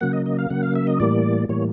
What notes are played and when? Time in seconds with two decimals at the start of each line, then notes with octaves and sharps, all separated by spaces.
0.01 C#3 F#3 A#3 F#5
0.13 D#5
0.26 D#5
0.38 F5
0.50 C#3 F#3 A#3 F#5
0.63 F5
0.75 E5
0.87 D#5
1.00 A2 E3 G3 A#3 D5
1.49 A2 E3 G3 A#3 C#5